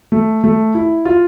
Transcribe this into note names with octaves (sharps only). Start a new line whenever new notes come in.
A3
A3
E4
F4